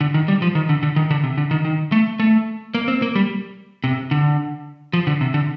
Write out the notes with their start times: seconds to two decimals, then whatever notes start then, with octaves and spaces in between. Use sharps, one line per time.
0.01 D3
0.14 D#3
0.28 G3
0.42 F3
0.55 D#3
0.69 D3
0.83 D3
0.96 D#3
1.11 D3
1.24 C3
1.38 D3
1.51 D#3
1.65 D#3
1.92 A3
2.20 A3
2.75 A#3
2.88 C4
3.02 A#3
3.15 G3
3.84 C3
4.11 D3
4.93 F3
5.07 D3
5.21 C3
5.34 D3